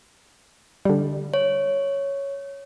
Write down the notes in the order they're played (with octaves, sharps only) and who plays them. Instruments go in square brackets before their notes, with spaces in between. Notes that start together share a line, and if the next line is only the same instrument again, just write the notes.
[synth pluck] D3 G3
[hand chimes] C#5